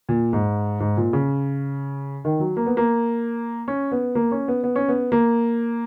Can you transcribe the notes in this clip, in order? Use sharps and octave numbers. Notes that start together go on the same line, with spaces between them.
A#2
G#2
G#2
A#2
C#3
D#3
F#3
A#3
B3
A#3
C#4
B3
A#3
C#4
B3
B3
C#4
B3
A#3